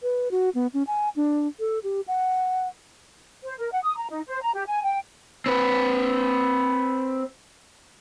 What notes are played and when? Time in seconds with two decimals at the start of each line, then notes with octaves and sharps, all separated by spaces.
0.03 B4
0.31 F#4
0.55 B3
0.74 C#4
0.87 G#5
1.16 D4
1.60 A4
1.84 G4
2.08 F#5
3.44 C5
3.58 A#4
3.71 F#5
3.83 D#6
3.97 A#5
4.10 D#4
4.27 C5
4.41 A#5
4.54 G4
4.67 G#5
4.83 G5
5.46 C4 B4